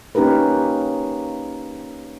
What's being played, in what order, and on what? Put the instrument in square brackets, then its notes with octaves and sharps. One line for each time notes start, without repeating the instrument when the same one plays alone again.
[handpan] A#3 C#4 D#4 G4 A#4 B4